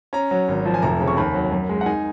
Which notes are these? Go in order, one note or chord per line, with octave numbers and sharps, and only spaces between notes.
C#4 A#5
F#3
G#1
F3
G#5
F1 A#5
C#3
C#6
D#2 B5
F#3
F#2
G#3
F#5
D#4 G#5